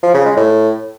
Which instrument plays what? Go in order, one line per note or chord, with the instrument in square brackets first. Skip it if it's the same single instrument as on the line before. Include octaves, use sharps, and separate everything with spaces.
[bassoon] F3
C#3
G#3
A2